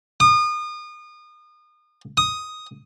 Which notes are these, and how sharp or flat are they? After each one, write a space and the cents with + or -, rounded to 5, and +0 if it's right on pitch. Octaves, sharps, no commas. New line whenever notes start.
D#6 -35
D#6 +5